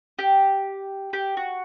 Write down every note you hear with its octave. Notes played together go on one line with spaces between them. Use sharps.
G4
G4
F#4